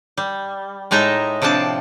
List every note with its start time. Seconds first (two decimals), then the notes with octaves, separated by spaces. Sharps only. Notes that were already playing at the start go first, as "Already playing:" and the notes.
0.17 G3
0.91 A2 G#3 D#4 E5 A5 A#5
1.42 C3 F3 C4 D4 A5